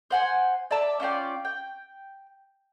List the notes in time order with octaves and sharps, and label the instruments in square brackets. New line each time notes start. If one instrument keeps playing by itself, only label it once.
[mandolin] C5 F#5 G#5
D5 E5 A5 D6
C#4 F4 D5 G5
G5